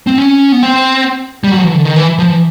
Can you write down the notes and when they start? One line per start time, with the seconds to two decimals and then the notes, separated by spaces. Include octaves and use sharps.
0.07 C4
0.18 C#4
0.52 B3
0.63 C4
1.44 G3
1.51 F#3
1.59 F3
1.63 E3
1.74 D3
1.85 D#3
1.96 E3
2.19 F3
2.30 E3